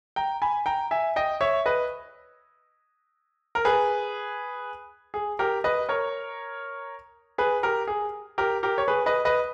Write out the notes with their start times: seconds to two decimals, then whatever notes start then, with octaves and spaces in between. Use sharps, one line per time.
0.16 G5 A#5
0.42 G#5 B5
0.66 G5 A#5
0.91 E5 G#5
1.16 D#5 G5
1.41 C#5 E5
1.66 B4 D#5
3.55 A#4
3.65 G#4 B4
5.14 G#4
5.39 G4 A#4
5.64 B4 D#5
5.89 A#4 C#5
7.38 G#4 B4
7.63 G4 A#4
7.88 G#4
8.38 G4 A#4
8.63 G4 A#4
8.78 C#5
8.88 G#4 B4
9.06 B4 D#5
9.25 B4 D#5